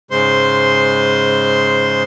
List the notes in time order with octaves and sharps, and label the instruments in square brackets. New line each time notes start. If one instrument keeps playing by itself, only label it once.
[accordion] G#2 C#3 G#3 C5 C6